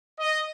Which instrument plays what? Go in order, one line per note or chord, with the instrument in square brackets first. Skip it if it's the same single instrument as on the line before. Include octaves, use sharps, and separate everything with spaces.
[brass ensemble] D#5